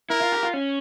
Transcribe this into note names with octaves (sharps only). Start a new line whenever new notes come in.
E4 A#4
F4
G4
F4
C#4